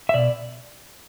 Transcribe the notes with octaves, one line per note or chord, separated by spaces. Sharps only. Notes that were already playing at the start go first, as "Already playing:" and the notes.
E5
B2 D5